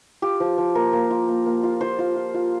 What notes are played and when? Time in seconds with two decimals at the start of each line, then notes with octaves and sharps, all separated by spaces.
0.22 F4 G4
0.40 F3
0.58 F3
0.75 A#3 A#4
0.93 A#3
1.11 F4
1.28 A#3
1.46 A#3
1.63 F4
1.81 F4 C5
1.99 F4
2.16 F4
2.34 F4